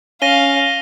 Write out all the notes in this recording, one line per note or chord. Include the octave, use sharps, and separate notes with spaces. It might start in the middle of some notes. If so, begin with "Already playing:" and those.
C#4 F5 A#6 D#7 G7